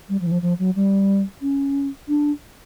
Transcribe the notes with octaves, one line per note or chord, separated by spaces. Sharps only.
G3
F3
E3
F3
F3
F#3
G3
C#4
D4